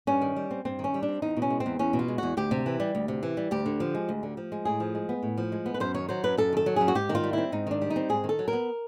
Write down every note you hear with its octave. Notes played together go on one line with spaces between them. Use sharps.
G2 C#4
D#3
G3
C4
G2 C4
D#3
C#4
G3
D4
C4
E2 D#4
B2
C#4
G#3
C4
E2
E2 C#4
B2
F4
G#3
E2 F#4
D2 G4
C3
E3
G3
D2
C3
E3
G3
D2 G4
D3
F3
G#3
D2
D3
F3
G#3
A2 G#4
F3
G#3
B3
A2
F3
G#3
B3
B4
F#2 C5
D#3 C#5
F#3 C5
F#2 B4
F#2 A4
D#3 A4
F#3
F#2 G#4
F#4
G#2 G4
D#3
F4
G3
C4 E4
G#2 D#4
D#3 D4
G3
D#4
C4
G#2 G#4
D#3
A4
F#3
A#4
B3